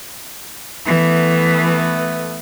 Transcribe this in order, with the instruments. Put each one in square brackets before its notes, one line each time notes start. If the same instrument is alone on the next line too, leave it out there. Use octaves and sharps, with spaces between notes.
[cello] E3 [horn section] A3 B3